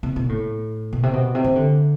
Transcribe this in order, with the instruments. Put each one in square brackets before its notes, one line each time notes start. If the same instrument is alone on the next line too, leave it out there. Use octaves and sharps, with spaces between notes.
[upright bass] C3
B2
A2
B2
C3
B2
C3
E3
D3